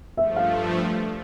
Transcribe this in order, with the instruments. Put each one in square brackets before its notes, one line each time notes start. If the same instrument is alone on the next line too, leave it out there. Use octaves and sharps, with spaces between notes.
[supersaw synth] G2 F3 A3 [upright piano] E5
[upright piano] F5